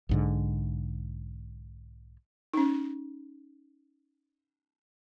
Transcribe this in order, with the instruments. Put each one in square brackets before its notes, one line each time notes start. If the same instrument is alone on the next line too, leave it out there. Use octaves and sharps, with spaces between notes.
[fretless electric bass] B1 G#2 D3
[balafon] C#4 D#4